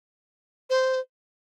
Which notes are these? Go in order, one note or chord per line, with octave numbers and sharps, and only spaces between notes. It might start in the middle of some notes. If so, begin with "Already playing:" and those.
C5